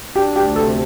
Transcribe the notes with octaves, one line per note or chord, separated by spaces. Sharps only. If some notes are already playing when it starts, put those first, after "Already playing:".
D4 G4
D2 G4
C3 A4